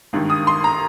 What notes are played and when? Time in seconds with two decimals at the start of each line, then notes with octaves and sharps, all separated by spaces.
0.13 G#1 G2 D#3
0.30 D#6
0.47 C6
0.64 A#5